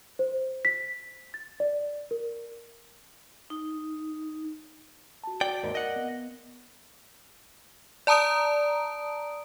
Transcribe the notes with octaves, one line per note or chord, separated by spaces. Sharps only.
C5
B6
A6
D5
A#4
D#4
F#4 A5
D5 G5
D#2 G#2 A#4 D5
D#5 F#5
B3
D5 A5 A#5 D#6 D7